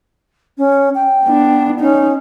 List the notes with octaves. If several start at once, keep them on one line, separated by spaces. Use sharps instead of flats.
C#4
G5
B3 D4
C#4 D#4